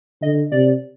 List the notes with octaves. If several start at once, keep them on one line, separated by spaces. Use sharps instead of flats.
D3 D#5
C3 D5